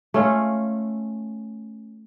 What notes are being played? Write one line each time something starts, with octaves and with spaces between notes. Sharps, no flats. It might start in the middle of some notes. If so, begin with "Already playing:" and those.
A3 C#4 F4